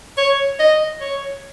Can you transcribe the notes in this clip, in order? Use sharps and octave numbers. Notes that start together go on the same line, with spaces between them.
C#5
D#5
C#5